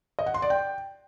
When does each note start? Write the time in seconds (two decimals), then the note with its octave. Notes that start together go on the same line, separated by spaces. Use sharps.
0.19 D#5
0.26 F#5
0.34 C6
0.42 D5
0.50 G5